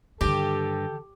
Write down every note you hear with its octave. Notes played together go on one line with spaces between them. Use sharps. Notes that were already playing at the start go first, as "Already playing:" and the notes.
G2 D3 D#3 G4 A4